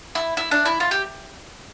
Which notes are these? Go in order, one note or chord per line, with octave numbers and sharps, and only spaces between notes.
E4
E4
D4
E4
F4
G4